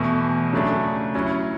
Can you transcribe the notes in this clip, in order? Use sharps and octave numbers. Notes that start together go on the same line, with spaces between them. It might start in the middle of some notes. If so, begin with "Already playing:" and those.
Already playing: E2 B2 A3
C#3 F#3 A3 D4 G#4
F#3 C#4 E4